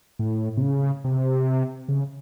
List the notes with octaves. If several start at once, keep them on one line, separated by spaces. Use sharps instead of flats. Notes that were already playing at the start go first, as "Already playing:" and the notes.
A2
C3
C#3
C3
C#3